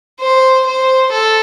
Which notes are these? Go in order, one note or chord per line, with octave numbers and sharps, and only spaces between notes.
C5
C5
A4